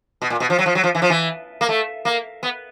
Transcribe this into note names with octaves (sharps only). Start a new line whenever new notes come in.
B2
A#2
B2
F3
F#3
F3
F#3
F3
E3
F3
E3
A#3
A3
A#3
B3